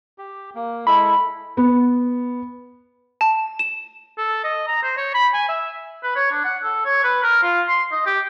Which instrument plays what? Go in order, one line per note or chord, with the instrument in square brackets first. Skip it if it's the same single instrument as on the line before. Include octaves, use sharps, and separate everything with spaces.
[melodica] G4
A#3
[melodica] G#3 E4 A4 [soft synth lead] B5
[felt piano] B3
[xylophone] A5
E7
[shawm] A4
D#5
A#5
C5
C#5
B5
G#5
E5
[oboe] B4
C#5
D4
F#5
A4
C#5
B4
A#4
F4
C6
D#5
G4